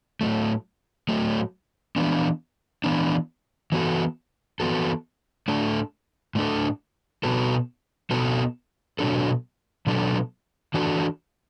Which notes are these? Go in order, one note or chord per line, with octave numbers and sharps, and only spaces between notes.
A2 F#3 A3
A2 F#3 A3
E3 B3 D4
E3 B3 D4
E3 B3 F#4 A4
E3 B3 F#4 A4
A2 A3 D4 A4
A2 A3 D4 A4
B2 B3 F#4 A4
B2 B3 F#4 A4
B2 F#3 D4 A4
B2 F#3 D4 A4
E3 D4 F#4 A4